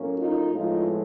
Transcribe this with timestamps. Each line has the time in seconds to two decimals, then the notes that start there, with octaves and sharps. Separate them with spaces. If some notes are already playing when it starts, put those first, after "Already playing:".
Already playing: A2 F#3 A#3 C#4
0.17 D#4 F4
0.52 A2 F3 G#3 B3 D#4 F4